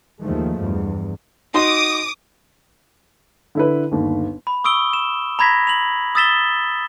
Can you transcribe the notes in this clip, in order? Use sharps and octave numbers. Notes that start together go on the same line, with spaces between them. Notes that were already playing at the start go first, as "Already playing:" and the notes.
D#2 D#3 F3 G#3 A3
E2 G2
D#4 F#4 C6 D6 D#6
D3 E4 B4
G1 D#2
B5
C#6 D#6 E6 D7 G7
E7
A#5 B5 G#6 A#6 B6
F7 F#7
D#6 E6 A6 B6 E7 G7